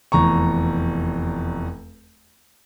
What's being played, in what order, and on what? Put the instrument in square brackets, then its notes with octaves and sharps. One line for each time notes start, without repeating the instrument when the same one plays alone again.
[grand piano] F1 E2 A#5 C#6